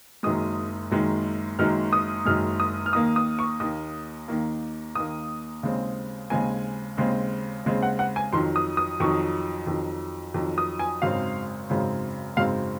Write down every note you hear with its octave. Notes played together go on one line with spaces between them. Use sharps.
F#1 F#2 D#3 G#3 D#6
F#1 F#2 D#3 G#3
F#1 F#2 D#3 G#3 F6
D#6
F#1 F#2 D#3 G#3 F6
D#6
F6
D#2 D#3 A#3 D#6
D#6
C#6
D#2 D#3 A#3 D#6
D#2 D#3 A#3
D#2 D#3 A#3 D#6
D#2 C#3 G#3 C4
D#2 C#3 G#3 C4 G#5
D#2 C#3 G#3 C4
D#2 C#3 G#3 C4
F#5
F#5
G#5
F2 D#3 F#3 C6
D#6
D#6
F2 D#3 F#3 C#6
F2 D#3 F#3
F2 D#3 F#3
D#6
G#5
G#1 F#2 C#3 G#3 C4 F5
G#1 F#2 C#3 G#3 C4
G#1 F#2 C#3 G#3 C4 F5